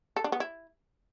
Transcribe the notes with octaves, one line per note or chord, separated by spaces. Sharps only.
A4
D4
B3
E4